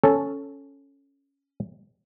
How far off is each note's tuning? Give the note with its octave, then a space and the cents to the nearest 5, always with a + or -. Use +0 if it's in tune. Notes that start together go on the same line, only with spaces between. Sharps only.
C#4 +0 A4 +0